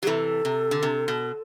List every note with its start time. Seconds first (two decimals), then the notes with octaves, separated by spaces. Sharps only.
0.03 F#3 G4
0.07 C3 E3 A4
0.45 C3
0.71 D3
0.83 C3
1.08 B2